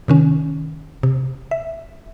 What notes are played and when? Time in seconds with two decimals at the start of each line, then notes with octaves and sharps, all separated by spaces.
0.08 C3 D#3 C#4
1.03 C3
1.51 E5